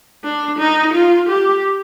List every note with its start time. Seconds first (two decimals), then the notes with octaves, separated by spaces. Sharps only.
0.24 D4
0.59 D#4
0.94 F4
1.29 G4